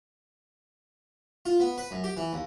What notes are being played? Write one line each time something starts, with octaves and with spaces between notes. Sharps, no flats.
F4
B3
B4
F#2
G4
E3
D#2